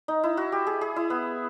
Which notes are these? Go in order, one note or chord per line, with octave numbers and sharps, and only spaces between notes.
D#4
E4
F#4
G4
G#4
G#4
E4
B3